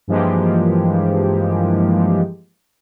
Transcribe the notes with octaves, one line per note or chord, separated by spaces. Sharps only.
G2 E3 F3 G#3 A#3 G4